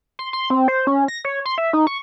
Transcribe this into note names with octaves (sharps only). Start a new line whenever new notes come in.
C6
C6
C4
C5
C#4
A#6
C#5
C6
E5
D#4
C#6